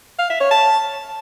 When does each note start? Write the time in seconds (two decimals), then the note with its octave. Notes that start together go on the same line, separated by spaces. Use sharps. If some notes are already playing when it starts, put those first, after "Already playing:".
0.19 F5
0.30 E5
0.40 C#5
0.51 A5